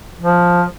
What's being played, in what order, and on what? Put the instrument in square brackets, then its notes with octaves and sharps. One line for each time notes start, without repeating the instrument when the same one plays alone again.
[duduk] F3